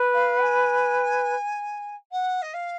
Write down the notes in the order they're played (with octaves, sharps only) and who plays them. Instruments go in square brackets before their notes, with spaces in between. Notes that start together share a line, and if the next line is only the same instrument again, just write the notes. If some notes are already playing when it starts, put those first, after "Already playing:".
Already playing: [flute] B4
[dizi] F5
G#5
F#5
D#5
F5